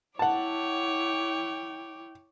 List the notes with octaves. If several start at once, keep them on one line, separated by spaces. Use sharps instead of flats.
E4 C#5 F#5 G5 A5 D6